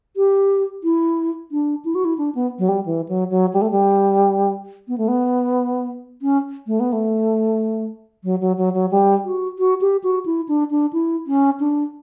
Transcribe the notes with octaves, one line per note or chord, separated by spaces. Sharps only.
G4
E4
D4
E4
F#4
E4
D4
B3
F#3
G3
E3
F#3
F#3
G3
A3
G3
B3
A3
B3
C#4
A3
B3
A3
F#3
F#3
F#3
F#3
G3
F#4
F#4
G4
F#4
E4
D4
D4
E4
C#4
D4